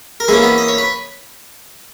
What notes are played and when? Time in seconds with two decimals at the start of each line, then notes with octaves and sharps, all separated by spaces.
0.20 A#4
0.28 E3 G#3 A#3 C#4 G#4
0.42 B3 B4
0.58 D#5
0.68 C#5
0.78 B4